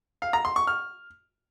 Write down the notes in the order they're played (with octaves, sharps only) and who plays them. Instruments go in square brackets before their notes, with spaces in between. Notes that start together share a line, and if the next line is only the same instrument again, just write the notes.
[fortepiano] F5
A#5
C6
C#6
F6